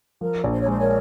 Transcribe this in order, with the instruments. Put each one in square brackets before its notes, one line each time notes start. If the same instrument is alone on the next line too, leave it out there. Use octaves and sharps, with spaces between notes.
[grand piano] F3 [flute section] A#4
[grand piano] A#1
[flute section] C5
C#5
[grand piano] G#3 [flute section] C5
[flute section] A#4 C#5